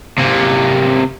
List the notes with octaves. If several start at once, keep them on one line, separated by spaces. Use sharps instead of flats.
C3 A#3